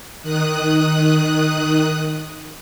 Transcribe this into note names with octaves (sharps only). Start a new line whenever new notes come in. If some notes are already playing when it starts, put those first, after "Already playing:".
D#3 D#6 F#6